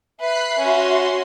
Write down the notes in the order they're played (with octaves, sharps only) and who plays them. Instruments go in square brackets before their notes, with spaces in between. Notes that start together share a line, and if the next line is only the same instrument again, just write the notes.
[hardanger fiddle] B4 [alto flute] E5 [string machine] B5 F#6 C7
[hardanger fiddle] C#4 [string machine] F#4 C6